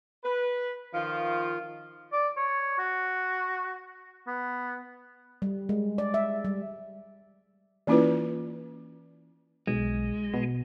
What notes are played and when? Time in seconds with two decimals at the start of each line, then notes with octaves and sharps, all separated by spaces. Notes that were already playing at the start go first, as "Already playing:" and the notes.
0.23 B4
0.94 D#3 F3 F4
2.13 D5
2.37 C#5
2.79 F#4
4.27 B3
5.42 G3
5.69 G#3
5.98 D5
6.14 E5
6.45 G3
7.87 E3 A#3 C#4 E4 F4 B4
9.67 B1 G#3
10.34 B2